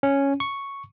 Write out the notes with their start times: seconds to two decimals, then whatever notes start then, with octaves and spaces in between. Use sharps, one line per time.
0.03 C#4
0.40 C#6